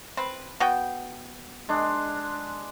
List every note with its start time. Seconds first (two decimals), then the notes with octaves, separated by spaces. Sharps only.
0.17 C4 B4
0.60 B3 F#4 G5
1.69 G#3 D4